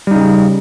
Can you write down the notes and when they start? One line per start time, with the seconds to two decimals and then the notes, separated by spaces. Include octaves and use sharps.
0.07 G3
0.11 D#4
0.15 C#3